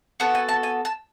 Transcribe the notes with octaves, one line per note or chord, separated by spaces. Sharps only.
B3 F#4 A4 A5
G#5
A5
G#5
A5